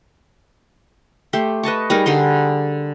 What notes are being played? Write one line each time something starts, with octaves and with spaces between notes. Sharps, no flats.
A3 G4 C6
B4 D#5 A5 C#6
G3 D#4 G#4 A#4
D3 G3 G#4 C6